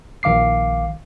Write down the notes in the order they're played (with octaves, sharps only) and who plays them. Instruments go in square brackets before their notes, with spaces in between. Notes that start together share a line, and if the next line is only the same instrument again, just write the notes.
[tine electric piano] A#1 D#3 F5 D6 C7